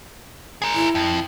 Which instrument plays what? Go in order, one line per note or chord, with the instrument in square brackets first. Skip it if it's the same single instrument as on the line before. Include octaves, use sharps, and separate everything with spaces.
[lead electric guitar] G#4 A#4
[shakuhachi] E4
[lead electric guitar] F2